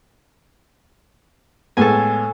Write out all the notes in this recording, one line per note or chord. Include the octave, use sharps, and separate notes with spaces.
A2 G#3 B3 A4 G#5